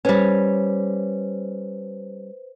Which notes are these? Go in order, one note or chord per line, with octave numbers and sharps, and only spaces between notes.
G3 C#4 B4 C5